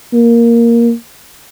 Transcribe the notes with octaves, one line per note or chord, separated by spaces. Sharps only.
A#3